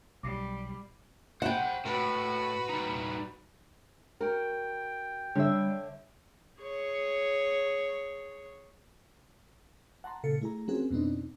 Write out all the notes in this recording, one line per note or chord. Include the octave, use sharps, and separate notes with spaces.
B1 G3 D6 C7
C5 F#5 G5 B5
A2 F#4 B4
G3 D#4
F#4 A#4 G5
D3 G3 C#5 E5
G#4 C#5
F#5 A5 A#5 C6
A#2 C#3 A4 F5 C#7
A3 E4 G#4 A#5
F3 C4 C#4 F#4 G#4 A#4
F2 B2 B3 C4 D4 D#4